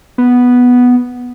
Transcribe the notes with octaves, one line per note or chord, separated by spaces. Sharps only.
B3